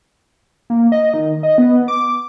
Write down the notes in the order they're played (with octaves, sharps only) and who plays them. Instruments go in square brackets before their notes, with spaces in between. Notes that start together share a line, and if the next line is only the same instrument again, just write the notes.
[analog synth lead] A#3
D#5
D#3
D#5
B3
D6